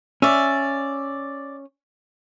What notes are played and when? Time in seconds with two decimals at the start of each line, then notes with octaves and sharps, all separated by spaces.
0.22 C#4 D5 E5